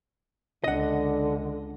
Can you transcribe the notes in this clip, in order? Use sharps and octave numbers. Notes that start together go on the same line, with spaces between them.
C#2 D3 D4 D#5 F#5